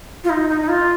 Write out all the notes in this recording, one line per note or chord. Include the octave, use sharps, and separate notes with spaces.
F4
D#4
D#4
D#4
F4